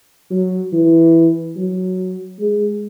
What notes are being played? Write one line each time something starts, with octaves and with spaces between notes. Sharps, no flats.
F#3
E3
F#3
G#3